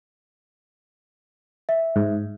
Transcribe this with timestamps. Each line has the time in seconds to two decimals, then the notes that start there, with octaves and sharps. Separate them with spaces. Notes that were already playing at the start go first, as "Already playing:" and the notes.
1.69 E5
1.96 G#2